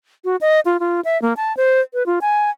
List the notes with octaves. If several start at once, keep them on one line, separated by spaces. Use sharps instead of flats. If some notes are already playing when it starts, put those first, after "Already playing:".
F#4
D#5
F4
F4
E5
A#3
A5
C5
B4
F4
G#5